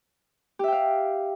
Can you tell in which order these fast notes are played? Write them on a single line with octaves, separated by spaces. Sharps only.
G4 E5 G5 F5